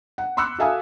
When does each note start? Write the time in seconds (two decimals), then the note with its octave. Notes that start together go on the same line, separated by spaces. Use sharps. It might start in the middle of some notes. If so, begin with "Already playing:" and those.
0.18 F#5
0.37 B5 C6 D6 E6 F#6 C#7
0.58 F#4 A4 E5 F5 G#5 D#6